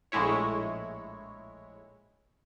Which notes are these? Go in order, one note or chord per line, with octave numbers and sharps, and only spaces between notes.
A#1 A2 G#3 E4 C#5